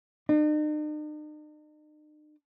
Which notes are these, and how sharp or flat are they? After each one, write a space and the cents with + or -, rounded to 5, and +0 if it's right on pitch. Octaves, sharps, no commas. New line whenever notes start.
D#4 -45